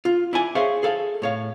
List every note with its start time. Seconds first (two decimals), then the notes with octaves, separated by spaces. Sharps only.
0.05 F4
0.33 E4 D5 G#5
0.55 G#4 C5 C#5 E5 F5
0.83 G#4 A4 F5
1.22 A2 C#5 F5